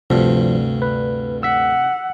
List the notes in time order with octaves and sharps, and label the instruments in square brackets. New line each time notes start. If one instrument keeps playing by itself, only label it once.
[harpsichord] D2 G2 [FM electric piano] C3 [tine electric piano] F3
[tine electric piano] B4
[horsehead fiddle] F#5 [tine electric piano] E6 B6